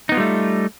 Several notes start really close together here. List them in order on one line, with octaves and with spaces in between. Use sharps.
D#4 B3 F4 G3 A3